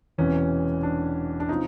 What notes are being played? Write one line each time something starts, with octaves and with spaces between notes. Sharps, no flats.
E1 E2 C3 E3 C#4
D4
D4
C3 F3 D#4